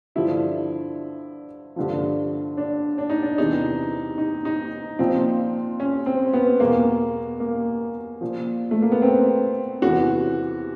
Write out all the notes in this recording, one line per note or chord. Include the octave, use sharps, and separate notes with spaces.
G2 D3 F3 E4
G2 D3 F3
D4
D4
D#4
D4
E2 C3 E3 D#4
D#4
D#4
A#2 F3 C4
C#4
C4
B3
E2 B2 A#3
A#3
A#2 F3
A3
A#3
B3
C4
E2 C3 E3 F#4